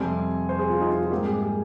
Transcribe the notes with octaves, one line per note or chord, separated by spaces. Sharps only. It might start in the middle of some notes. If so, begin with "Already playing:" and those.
Already playing: F2 C3 G3 C4 G#5
C5
G#4
F4
D#4
F4
F4
G#2 G3 A#3 G4
G#4
G#4